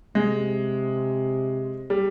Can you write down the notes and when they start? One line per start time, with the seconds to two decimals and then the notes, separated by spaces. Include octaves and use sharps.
0.15 C3 G#3
1.90 G3